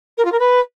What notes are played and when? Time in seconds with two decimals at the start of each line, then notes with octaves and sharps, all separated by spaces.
0.17 A#4
0.25 F4
0.32 A#4
0.39 B4